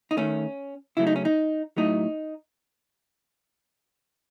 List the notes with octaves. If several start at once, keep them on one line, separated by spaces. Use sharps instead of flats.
D#4
D#3 A3 C#4
C#3 F#3 A3 E4
D#4
C#4
D#4
A2 F#3 A3 D#4